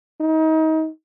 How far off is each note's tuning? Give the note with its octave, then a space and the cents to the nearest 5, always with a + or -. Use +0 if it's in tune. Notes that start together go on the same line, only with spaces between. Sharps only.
D#4 +30